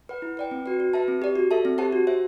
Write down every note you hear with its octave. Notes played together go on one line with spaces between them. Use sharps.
B4 F#5
E4
B4 D5 G5
C4
F#4 B4
F#4
B4 E5 A5
C4
G4 D5
F#4
A4 E5 A5
C4
G4 C5 F#5 A5
F#4
C5 E5